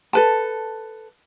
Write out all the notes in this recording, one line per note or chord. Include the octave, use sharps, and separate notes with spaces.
A4 B4 A5